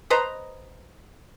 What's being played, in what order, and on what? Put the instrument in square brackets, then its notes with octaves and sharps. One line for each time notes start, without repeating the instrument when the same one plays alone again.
[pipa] B4 C5 D#5 A#5